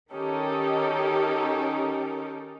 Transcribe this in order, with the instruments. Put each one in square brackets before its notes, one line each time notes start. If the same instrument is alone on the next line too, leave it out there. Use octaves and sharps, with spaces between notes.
[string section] D#3 C#4 D#4 G4 A4 A#4